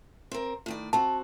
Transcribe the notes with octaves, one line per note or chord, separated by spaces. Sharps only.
C4 A#4
A2 D#3 D5
C4 F#4 A5